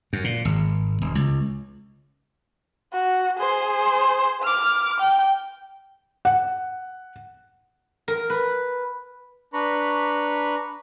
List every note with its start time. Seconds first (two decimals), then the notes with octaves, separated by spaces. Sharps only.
0.13 F#2
0.24 A#2
0.45 G#1
1.01 E1
1.15 C#2
2.93 F#4
3.39 G#4 C5
4.42 D6 F6
5.00 G5
6.25 F#5
8.08 A#4
8.30 B4
9.53 D4 B4 A#5 B5 C#6